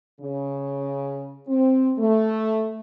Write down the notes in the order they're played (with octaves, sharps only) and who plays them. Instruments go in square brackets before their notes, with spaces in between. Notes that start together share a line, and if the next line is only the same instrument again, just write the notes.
[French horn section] C#3
C4
A3